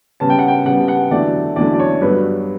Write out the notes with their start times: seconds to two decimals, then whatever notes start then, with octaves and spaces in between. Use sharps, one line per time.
0.20 C#3 G3 B3 A5
0.30 G5
0.39 F#5
0.48 G5
0.66 C#3 G3 B3 F#5
0.88 F#5
1.11 E2 D3 F#3 A3 D5
1.56 E2 D3 F#3 A3 D5
1.74 D5
1.80 C#5
2.01 G2 F#3 B3 B4